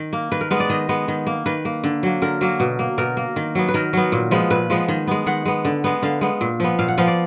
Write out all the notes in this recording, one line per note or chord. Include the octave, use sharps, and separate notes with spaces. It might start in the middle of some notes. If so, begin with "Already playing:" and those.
Already playing: D#3
A#3
D#3 B4
A#4
G#3 B3 B4
D5
D#3 D#5
G#3 B3
D#3
A#3
D#3 B4
A#3
D3
F#3 A#3
D3 A#4
F#3 A#3
B2
A#3
B2 A#4
A#3
D#3
F#3 B3
B4
D#3 A#4
F#3 B3
A#2
F3 G#3 B3
A#2 B4
F3 G#3 B3
D#3
G#3 B3
D#3 F#5
G#3 B3
D3
G#3 B3
D3 F5
G#3 B3
A#2
F3 B3
A#2 F5
F#5
F3 B3 F5
D5